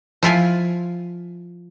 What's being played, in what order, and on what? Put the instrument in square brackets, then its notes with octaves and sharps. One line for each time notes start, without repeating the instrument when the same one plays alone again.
[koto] F3 E4 F4 G#5